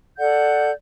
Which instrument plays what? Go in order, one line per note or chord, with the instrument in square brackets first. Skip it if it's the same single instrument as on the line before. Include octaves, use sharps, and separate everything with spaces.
[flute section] A4 D5 F#5 G6